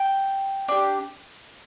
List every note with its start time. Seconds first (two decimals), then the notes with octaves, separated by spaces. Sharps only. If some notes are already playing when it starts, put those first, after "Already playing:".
Already playing: G5
0.68 D4 G4